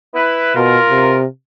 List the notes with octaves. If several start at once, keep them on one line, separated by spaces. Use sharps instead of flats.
E4 B4
B2 F4 A#4
C3